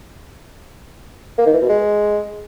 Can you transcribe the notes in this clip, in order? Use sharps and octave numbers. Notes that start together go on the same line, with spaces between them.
A#3
D#3
E3
B2
G#3